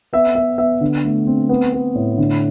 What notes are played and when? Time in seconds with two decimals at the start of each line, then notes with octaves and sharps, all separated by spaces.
0.13 B3 E5
0.35 B3 E5
0.58 B3 E5
0.81 D3
1.05 A3
1.27 C4
1.49 B3
1.73 B3
1.95 A2
2.18 D3